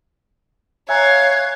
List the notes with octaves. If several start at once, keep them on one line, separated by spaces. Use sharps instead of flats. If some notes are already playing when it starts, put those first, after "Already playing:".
C#5 E5 F5 G#5 A#5 F#6 G#6